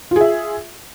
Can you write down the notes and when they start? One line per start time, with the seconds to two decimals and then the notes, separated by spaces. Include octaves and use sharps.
0.11 F4
0.16 G#4
0.21 E5